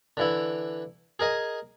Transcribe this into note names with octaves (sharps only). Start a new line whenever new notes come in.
D3 E3 E4
G#4 A#4 D#5 G#5